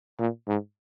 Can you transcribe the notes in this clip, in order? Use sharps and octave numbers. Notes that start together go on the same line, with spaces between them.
A#2
G#2